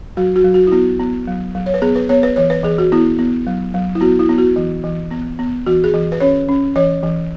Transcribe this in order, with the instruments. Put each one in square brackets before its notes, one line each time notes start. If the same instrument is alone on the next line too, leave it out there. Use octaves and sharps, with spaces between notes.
[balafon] F#3 F#4
F#4
F#3
F#4
E4
B3 F#4
B3
F#3
F#3
C#5
B4
B3 G#4
B4
B3 C#5
B4
E3 C#5
B4
E3 G#4
F#4
B3 E4
B3
F#3
F#3
E4
B3 F#4
E4
B3
F#4
E3
E3
B3
B3
E3 F#4
G#4
E3
B4
C#4 C#5
C#4
E3 C#5
E3